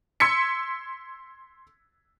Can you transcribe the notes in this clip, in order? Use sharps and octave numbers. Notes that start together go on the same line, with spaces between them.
C6 E6 G#6 B6 C#7